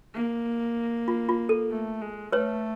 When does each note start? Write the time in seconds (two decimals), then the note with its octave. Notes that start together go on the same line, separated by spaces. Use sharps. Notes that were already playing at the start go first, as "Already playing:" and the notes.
0.14 A#3
1.08 F4
1.29 F4
1.49 A4
1.70 A3
2.01 G#3
2.32 A3 B4 C#5